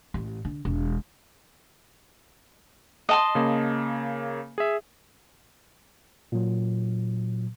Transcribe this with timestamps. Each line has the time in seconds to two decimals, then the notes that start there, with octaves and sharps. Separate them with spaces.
0.14 A1
0.45 D3
0.65 E1
3.09 D#5 A5 C6
3.35 C#3 A#3
4.58 G#4 E5
6.32 A#2 F#3